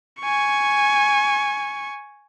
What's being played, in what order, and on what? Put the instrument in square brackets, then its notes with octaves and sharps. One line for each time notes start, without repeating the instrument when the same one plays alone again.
[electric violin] G#5 C#6